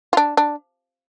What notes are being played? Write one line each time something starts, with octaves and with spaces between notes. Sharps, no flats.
F4
D4
D4